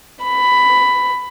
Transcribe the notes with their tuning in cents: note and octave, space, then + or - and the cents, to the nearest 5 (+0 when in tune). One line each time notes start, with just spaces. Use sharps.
B5 +10